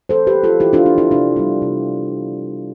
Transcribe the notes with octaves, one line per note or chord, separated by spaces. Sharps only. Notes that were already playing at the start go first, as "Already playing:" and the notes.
E3 A4 C5
G4 B4
B3
F4 A4
E3 E4 G4
D4 F4
B3 D4
E4
C3 D4
G3 B3
C3